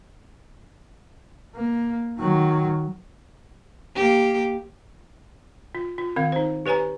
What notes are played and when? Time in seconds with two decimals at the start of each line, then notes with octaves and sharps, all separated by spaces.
1.56 A#3
2.19 D#3 F#3
3.95 A#3 G4
5.75 F4
5.98 F4
6.16 D#3 C4 F5
6.32 D#4 C5
6.66 G4 B4 C#5 G#5 A#5